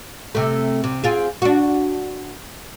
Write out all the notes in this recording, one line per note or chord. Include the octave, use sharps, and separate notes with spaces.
C3 A3
C3
C4 F4 G#4
D4 F#4